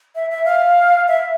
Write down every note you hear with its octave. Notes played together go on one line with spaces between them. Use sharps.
E5
E5
F5
E5